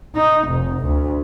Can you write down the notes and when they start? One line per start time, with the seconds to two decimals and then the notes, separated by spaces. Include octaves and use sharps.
0.16 D#4
0.49 F1
0.85 D2